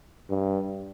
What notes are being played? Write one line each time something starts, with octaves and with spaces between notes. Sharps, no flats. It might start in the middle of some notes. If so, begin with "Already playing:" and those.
G2